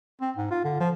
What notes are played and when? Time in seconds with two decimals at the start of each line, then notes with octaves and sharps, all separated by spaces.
0.21 C4
0.36 G#2
0.50 F4
0.64 D3
0.80 F3